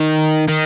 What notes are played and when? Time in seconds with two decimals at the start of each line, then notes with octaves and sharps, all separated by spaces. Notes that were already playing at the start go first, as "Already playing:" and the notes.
Already playing: D#3
0.48 D#3